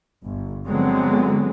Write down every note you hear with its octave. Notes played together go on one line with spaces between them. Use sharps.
G1
D3 F3 F#3 G#3 B3 C4